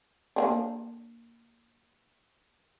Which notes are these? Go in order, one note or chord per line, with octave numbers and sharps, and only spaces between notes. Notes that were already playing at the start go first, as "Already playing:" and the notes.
A#3 C#4 D4